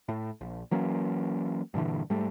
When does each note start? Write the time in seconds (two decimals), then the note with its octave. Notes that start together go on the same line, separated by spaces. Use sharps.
0.08 A2
0.41 A#1
0.71 E3 F#3 A#3 C#4
1.74 G2 A#2 D3 E3
2.10 G#2 G3 A3